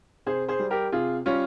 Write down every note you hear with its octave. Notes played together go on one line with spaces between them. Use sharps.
C3 G#4 C5
G#4 C5
G3
G4 A#4
C3 F4 G#4
G3 C#4 F4